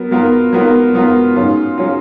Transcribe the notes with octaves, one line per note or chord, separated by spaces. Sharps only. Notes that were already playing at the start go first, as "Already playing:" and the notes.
Already playing: F#3 B3 A#4
F#3 B3 F4 A#4
F#3 B3 F4 A#4
F#3 B3 F4 A#4
G#2 F#3 C#4 F4
F#3 C#4 F4